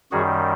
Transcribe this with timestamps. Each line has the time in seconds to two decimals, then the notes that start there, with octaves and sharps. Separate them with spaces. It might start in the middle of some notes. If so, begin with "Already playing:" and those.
0.11 F#2 D#3 G3 F#4 G#4